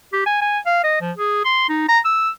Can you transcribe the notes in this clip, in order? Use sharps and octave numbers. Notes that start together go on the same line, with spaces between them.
G4
G#5
G#5
F5
D#5
F3
G#4
C6
D#4
A#5
E6